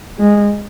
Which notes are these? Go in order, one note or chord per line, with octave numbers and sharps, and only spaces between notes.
G#3